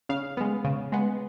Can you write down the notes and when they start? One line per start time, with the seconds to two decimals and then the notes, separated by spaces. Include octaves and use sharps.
0.09 C#3 F5
0.37 G#3 B3
0.64 C#3
0.92 G#3 B3